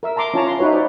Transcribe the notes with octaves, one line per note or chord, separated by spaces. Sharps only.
A#4 E5 E6
A5 A#5 C6 D6
C#4 E4 F4 C#5 A5 A#5
C6
D#4 E4 F#4 B4 C#5
C5 D5